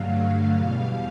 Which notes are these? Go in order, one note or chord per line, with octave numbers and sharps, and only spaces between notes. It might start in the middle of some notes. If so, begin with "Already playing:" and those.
Already playing: G2 D3 F#3 A3 F5
F5
E2 B2 G3